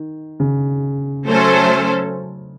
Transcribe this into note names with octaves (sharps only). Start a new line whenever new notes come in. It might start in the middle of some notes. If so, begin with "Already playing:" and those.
Already playing: D#3
C#3
F#3 A3 C#4 A4 C5